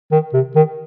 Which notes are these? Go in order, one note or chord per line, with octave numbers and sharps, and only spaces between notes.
D#3
C3
D#3